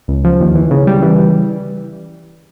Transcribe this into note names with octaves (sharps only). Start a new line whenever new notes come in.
C#2
F3
D#2
E3
C#3
G3
E3